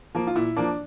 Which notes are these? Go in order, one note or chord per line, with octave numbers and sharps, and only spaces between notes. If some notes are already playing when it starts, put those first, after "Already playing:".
F3 A#3
F4
A#2 E4
F3 A#3 D4